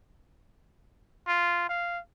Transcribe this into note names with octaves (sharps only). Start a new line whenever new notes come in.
F4
F5